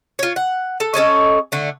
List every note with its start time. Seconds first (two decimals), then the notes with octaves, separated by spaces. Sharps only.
0.19 F4 C#5
0.36 F#5
0.80 A4
0.94 C#4 A4 C#5 D#5
1.52 D3 A3